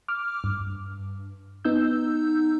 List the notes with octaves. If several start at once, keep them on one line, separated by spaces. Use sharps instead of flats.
D6 F6
G2
B3 D#4 E6 G6